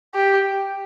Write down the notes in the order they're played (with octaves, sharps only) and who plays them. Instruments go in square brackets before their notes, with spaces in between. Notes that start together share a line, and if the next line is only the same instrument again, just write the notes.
[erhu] G4